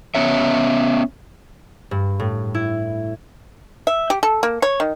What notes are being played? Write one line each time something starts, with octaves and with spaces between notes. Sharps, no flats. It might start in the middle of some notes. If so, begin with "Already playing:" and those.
B3 C#4 C#5 E5
G2
A2
E4
E5
G4
A4
A#3
C#5
D#3